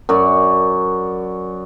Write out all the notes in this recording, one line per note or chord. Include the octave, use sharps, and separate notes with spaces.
F#2 F#4 D5